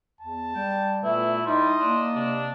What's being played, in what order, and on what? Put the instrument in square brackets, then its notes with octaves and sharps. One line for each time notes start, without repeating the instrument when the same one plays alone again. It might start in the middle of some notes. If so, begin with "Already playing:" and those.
[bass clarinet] E2 [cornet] A5
[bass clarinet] G3 [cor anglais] G5
[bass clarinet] A#2 [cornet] A3 [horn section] B3 B4 E5 [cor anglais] E4
[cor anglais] G3 [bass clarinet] D#4 [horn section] E4 C6 [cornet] D#5
[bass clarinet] A#3 [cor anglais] D4
[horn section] C3 [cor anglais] D4